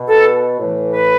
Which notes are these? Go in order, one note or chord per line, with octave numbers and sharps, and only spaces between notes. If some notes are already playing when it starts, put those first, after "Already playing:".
Already playing: B2
A4
A2 E3
B4